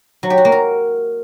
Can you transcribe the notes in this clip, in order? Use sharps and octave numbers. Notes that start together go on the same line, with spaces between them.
F#3
G4
F#4
A#3
A#4